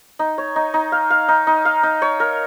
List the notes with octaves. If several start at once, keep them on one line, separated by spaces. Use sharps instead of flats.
D#4
C#5
D#4
D#4
F5
F5
D#4
D#4
F5
D#4
C#5
A#4